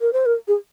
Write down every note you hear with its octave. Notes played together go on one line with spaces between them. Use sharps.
A#4
C5
A#4
G#4